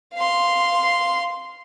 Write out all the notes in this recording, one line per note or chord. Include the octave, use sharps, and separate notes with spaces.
F5 C6